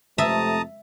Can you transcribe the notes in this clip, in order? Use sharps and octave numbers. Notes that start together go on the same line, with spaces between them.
F2 C3 A3 E5 A5 A#5 D#6